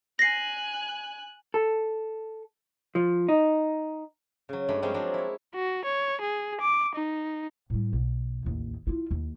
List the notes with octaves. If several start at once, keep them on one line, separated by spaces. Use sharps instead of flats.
G#5 F#6 A#6 C7
A4
F3
D#4
C#3 F#3
G2 G#3 A3 D5 B5
F3 G3 G#3 A#3 C4 C#4
F3 F#3 G#3 D4
E4 C#5
F#4
C#5
G#4
D6
D#4
A2 G3
B1
A1 D#2
E4 F4
D#2